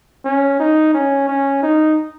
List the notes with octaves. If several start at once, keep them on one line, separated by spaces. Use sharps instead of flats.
C#4
D#4
C#4
C#4
D#4